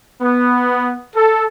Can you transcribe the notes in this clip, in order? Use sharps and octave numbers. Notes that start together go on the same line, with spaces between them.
B3
A4